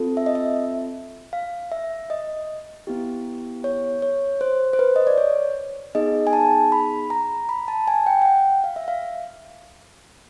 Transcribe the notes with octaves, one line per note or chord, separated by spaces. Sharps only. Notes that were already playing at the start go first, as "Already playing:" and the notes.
Already playing: C4 F4 A4
E5
D#5
E5
F5
E5
D#5
B3 E4 G4
C#5
C#5
C5
C5
B4
D#5
D5
C#5
B3 D#4 G#4 D#5
G#5
A5
B5
A#5
B5
A5
G#5
G5
G5
F#5
F5
E5
F5